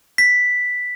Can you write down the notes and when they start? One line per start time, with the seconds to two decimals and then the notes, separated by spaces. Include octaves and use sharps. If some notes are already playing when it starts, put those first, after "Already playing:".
0.18 B6